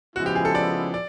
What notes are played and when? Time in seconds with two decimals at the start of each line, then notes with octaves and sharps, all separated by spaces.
0.16 C#3 F3 G#3 B3 E4 F#4
0.26 G4
0.35 G#4
0.45 A4
0.55 D5
0.94 D5